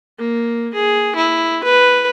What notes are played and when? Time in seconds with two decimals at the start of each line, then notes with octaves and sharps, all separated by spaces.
0.19 A#3
0.74 G#4
1.16 E4
1.64 B4